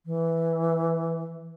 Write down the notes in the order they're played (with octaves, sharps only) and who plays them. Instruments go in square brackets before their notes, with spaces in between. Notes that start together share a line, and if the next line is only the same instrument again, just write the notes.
[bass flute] E3